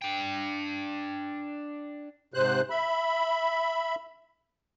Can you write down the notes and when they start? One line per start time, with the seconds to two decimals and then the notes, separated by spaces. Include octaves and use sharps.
0.02 D4 G5
2.34 G#2 C3 C5 F#6
2.70 E5 B5